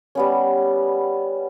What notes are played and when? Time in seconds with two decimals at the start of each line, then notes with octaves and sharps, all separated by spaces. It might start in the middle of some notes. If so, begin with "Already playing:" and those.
0.15 G3 B3 C#4